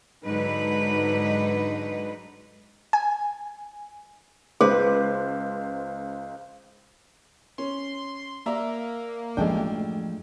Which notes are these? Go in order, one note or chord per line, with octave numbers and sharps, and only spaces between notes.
G#2 D3 F#3 D#4 B4
G#5
C#2 G#4 B4 C5
C#4 C6
A#3 D5 E5 A#5
A1 F#2 F3 G#3 A3 D4 G#4 G5